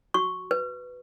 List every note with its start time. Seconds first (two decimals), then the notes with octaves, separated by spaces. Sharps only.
0.14 F#4 C#6
0.51 B4